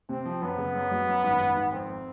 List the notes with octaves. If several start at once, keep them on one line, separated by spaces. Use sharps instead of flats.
C3 C4
F3
F#2 B3
C#3
F#2
F#3
F#2
G#1
G#1
G#1
F2 C4